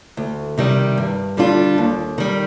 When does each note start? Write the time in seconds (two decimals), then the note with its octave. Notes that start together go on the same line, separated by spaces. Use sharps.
0.17 D2
0.58 C3 D#3 G3
0.97 G2
1.37 D3 G3 D4 F4
1.78 D#2
2.18 D#3 G3